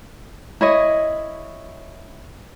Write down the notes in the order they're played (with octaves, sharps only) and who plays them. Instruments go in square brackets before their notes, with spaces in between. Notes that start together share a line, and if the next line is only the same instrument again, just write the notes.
[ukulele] E4 C#5 D#5